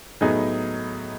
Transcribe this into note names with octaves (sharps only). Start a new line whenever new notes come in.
A2 F#3 B3 D#4 G#4